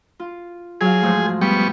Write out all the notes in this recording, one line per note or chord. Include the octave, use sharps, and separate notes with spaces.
F4
F#3 G#4 F5
G#2 F3 A3
G3 B3 C#6